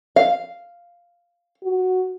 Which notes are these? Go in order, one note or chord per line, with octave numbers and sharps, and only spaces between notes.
F5
F#4